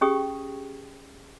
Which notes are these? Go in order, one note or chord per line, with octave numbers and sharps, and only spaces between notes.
C#4 G4 G#4 G5 C#6 D#6